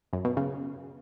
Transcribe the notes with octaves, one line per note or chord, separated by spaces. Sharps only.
F#2
B2
C#3